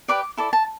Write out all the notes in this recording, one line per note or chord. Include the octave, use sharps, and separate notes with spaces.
G4 B4 D5 D6
E4 A4 D5
A5